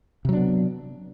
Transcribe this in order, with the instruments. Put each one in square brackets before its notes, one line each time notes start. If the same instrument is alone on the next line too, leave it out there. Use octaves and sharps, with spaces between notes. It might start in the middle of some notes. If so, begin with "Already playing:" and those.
[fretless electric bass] C3
F#3
D4
B3